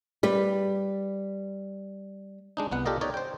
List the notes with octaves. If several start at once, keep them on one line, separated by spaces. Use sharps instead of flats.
G3 B4
G#3 D4 D#4
C2 B3 F#5
F4 G4 A4 A#4 D5 D#5
D#4 C#5 D5
C5 G5